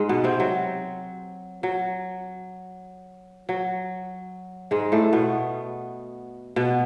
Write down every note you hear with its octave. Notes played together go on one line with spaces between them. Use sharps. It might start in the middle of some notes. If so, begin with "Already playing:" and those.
Already playing: G#2 G#3
B2 B3
C3 C4
F#3
F#3
F#3
G#2 G#3
A2 A3
B2 B3
B2 B3